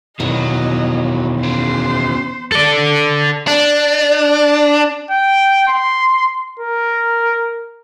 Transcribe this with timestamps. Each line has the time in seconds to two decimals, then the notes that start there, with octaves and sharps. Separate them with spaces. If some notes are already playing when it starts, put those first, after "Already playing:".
0.20 E2 B2 D#3 E3 F#3 D#5
1.43 C#3 F#3 C5
2.52 A4 D5
3.47 D4
5.11 G5
5.68 C6
6.60 A#4